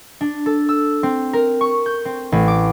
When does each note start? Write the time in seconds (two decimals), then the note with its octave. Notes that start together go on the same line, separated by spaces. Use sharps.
0.21 D4
0.46 A4
0.69 E6
1.03 C4
1.33 A#4
1.61 C#6
1.86 G6
2.05 C4
2.32 A1
2.48 D6